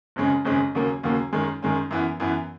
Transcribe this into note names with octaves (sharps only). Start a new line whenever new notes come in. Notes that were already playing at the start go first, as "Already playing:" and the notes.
G#1 F#2 C#3 G#3 C#4
G#1 F#2 C#3 G#3 C#4
D#2 C#3 F#3 A#3
D#2 C#3 F#3 A#3
F#2 D#3 G#3 C#4
F#2 D#3 G#3 C#4
F#2 E3 B3
F#2 E3 B3